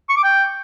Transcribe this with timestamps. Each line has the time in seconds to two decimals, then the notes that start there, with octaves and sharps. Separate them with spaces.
0.09 C#6
0.16 D6
0.24 G5